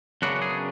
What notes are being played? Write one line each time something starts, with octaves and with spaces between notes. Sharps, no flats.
F#2 C#3 F#3 B3 D4 F#4
G#4